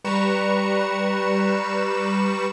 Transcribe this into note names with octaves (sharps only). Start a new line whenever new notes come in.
G3 B4 A#5 C#6 C#7 E7